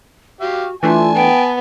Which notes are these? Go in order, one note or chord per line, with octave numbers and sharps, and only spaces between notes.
F#4 G4 F5
E3 A3 D4 F4 G#5 A5
B3 G5